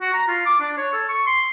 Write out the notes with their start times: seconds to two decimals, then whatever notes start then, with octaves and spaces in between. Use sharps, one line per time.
0.01 F#4
0.14 A#5
0.28 F4
0.46 D6
0.60 D4
0.78 C#5
0.93 A4
1.09 C#6
1.27 C6